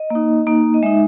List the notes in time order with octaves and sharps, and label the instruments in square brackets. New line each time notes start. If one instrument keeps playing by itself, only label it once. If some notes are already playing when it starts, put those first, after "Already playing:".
Already playing: [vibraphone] D#5
A#3 D#4
A#3 D#4
D#5
G#3 D#4 E5